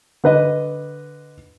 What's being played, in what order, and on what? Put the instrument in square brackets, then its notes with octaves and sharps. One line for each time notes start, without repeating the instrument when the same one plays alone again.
[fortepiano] D3 B4 D#5